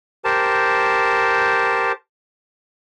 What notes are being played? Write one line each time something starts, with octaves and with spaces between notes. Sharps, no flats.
G4 A#4 C5 A5